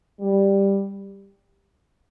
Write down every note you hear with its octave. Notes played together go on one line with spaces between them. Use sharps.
G3